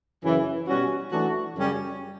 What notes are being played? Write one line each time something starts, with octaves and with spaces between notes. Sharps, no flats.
F#2 C#3 E3
B2 G3 C#4 F#4
E3 A3 D4 F#4
F#2 C#3 G3 C#4